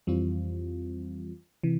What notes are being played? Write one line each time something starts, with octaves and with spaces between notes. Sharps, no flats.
F2 E3 G3 C4 F4
C3 E3